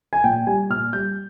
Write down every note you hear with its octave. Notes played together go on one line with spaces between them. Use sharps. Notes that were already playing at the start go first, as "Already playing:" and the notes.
G#5
A#2 G5
G3 G#5
A#2 F6
G3 G6